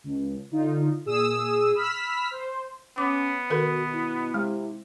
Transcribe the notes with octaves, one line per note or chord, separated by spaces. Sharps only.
C#2
D3 D#4 F4
A#2 G#4 D#6 E6
B5 E6 F6 B6
C5
B3 C#4 D6
B2 D#3 F#4 A4 A#4
E4
C3 G#3